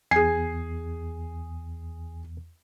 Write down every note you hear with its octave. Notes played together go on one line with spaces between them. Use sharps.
E2 G#4 G#5 C7